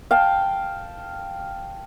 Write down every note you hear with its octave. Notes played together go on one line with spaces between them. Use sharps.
F5 G5 A5